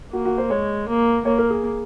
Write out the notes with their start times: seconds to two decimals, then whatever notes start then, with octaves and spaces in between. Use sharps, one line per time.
0.13 A#3 F#4
0.25 F#4
0.38 C5
0.50 G#3 C#5
0.88 A#3
1.25 A#3 C#5
1.39 A#4
1.50 G#4